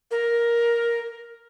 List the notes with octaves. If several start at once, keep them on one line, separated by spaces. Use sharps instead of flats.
A#4